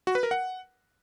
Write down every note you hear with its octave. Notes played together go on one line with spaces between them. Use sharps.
F#4
B4
A#4
F#5